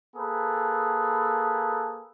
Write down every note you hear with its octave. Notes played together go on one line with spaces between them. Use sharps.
A#3 G#4 A4 B4